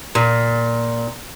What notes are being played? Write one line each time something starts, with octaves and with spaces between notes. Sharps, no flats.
A#2